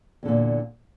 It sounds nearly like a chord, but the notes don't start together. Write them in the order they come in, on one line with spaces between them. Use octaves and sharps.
E2 D3 A#2